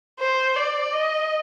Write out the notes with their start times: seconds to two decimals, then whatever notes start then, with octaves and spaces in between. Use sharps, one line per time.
0.20 C5
0.56 D5
0.93 D#5